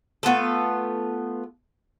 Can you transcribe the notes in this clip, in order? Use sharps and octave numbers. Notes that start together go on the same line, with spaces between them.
A3 B3 F4 A4